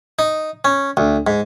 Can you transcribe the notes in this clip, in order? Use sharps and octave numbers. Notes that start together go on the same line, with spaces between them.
D#4
C#4
D2
G#2